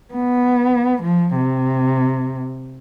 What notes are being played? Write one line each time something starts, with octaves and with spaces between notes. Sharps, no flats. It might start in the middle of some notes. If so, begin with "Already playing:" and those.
B3
F3
C3